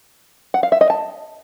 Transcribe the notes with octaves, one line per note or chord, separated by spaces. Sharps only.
F#5
F5
E5
D#5
A5